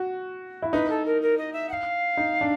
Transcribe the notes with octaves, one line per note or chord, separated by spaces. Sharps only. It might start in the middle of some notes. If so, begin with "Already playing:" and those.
Already playing: F#4
E4
D#4 B4
A4
A#4
A#4
D#5
E5
F#5
F5
D#4
D4